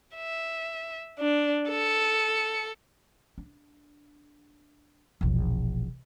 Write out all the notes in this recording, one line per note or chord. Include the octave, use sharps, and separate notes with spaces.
E5
D4
A4 C#7
D4
E1 A#1